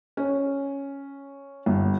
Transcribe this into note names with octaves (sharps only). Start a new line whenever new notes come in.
C#4
G1